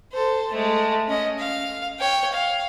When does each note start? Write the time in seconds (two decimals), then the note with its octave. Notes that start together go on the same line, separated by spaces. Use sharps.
0.12 A4 C5
0.52 G#3 A3
1.08 C#4 D#5
1.38 F5
1.99 C#5 G5
2.33 F5